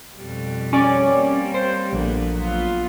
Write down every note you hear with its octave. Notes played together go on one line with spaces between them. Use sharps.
F2 B2 G3
C#4 D5
G3 A#3 C4
C5
A#1 D3 A#3 B3
F#3 B3 F4